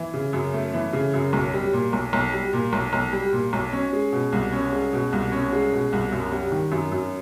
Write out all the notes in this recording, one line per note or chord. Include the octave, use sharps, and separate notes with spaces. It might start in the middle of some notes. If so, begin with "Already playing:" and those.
Already playing: E3
C#3
F#2
A3
E3
C#3
F#2
B1
G3
A#2
B1
B1
G3
A#2
B1
B1
G3
A#2
B1
C#4
G#3
B2
C2
C#4
G#3
B2
C2
C#4
G#3
B2
C2
F#2
G3
D#3
F#2
F#2